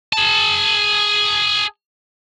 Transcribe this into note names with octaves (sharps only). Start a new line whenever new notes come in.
G#4 A5